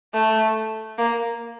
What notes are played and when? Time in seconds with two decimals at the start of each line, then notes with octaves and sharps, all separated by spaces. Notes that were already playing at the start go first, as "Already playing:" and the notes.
0.14 A3
0.98 A#3